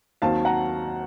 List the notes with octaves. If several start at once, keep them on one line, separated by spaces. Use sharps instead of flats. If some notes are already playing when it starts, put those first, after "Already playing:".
D#2 D#3 F#3 C4 F5 A5
F#5 A#5